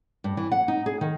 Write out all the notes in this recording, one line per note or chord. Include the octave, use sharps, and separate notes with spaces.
G2
E3
F#5
D#4
G#4
D#3